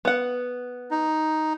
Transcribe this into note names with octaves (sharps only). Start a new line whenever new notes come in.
B3 F#5
D#4